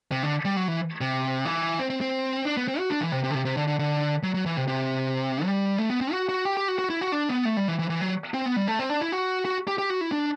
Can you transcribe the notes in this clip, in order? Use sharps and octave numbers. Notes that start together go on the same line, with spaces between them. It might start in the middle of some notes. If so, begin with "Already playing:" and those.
C3
D3
G3
F#3
E3
C3
E3
C4
C4
C4
D4
B3
C4
F#4
D4
E3
C3
C3
D3
C3
C3
D3
D3
D3
F#3
F#3
E3
C3
C3
G3
A3
B3
C4
F#4
F#4
G4
G4
F#4
F#4
E4
F#4
D4
B3
A3
G3
E3
E3
E3
F#3
C4
B3
G3
A3
C4
D4
E4
F#4
F#4
G4
G4
F#4
E4
D4